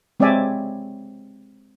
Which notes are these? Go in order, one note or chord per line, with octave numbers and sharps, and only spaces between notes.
G#3 C4 C#5 D5 E5 G#5